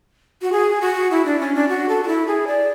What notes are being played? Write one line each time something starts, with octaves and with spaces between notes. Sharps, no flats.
F#4
G#4
F#4
E4
D4
C#4
D4
F#4
A4
F#4
E4
G#4
D5